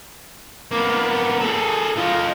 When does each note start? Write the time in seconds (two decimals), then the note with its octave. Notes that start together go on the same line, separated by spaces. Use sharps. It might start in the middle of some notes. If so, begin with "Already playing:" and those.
0.71 A#3 B3
1.41 G#4 A4
1.97 F4 D#5